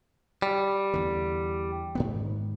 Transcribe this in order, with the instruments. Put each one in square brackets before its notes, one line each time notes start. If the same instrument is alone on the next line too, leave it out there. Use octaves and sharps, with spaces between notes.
[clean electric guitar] G3
[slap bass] E2 D3
G#2 D#3 B3